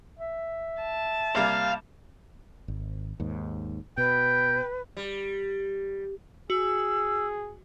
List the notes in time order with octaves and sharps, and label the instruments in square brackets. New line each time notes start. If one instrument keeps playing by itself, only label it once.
[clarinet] E5
[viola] A5
[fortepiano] C3 G3 A#3 [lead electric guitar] F5
[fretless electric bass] G#1
D#2 G#2
[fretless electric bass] B2 [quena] B4 [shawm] G5
[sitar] G3
[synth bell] F#4 [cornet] G#4 [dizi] E6